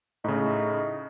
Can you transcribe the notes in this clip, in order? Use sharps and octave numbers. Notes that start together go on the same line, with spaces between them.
A2 C#3 D#4